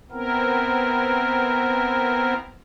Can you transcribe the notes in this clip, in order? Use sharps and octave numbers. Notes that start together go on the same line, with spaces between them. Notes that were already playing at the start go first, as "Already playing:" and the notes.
B3 C4 E4 A#4